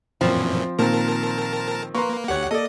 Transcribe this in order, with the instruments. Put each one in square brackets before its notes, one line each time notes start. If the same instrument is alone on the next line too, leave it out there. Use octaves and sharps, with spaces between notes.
[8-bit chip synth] F#2 A#2 E3 [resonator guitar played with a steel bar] F3 [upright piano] C4
[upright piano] A#2 [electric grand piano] D#3 C4 [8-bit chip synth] A#4 A5
[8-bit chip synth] A#3 [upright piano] B4 [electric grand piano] A#5 C6 C#6
[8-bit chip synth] D2 F#5 [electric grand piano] G4 C#5
[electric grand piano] A#3 D5 [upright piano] A4 [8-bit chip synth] D#5